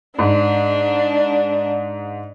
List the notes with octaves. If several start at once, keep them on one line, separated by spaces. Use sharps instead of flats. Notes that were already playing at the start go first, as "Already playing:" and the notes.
G#2 D4